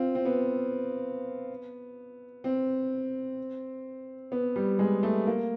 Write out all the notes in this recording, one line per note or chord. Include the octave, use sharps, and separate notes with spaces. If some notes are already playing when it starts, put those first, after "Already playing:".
Already playing: C4 F4
C4
B3
C4
B3
G3
G#3
A3
A#3